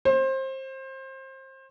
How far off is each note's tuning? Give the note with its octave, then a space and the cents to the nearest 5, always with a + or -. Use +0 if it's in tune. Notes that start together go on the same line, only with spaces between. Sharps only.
C5 +25